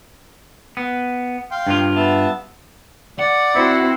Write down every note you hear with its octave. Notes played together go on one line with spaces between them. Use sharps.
B3
F5 G5 C6
G2 F4
B3 E5 A5
D5 F#5
C4 E4 F#4 C5